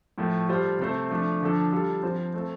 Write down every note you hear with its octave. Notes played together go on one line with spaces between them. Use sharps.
A2 F3 A3
G3 F4 A4 C5
C3 A3 C4 A4 C5
F3 A3 D4
D3 F3 D4 A4
G3 F4 A4
F3 C4 F4 C5
A3 C4 A4 C5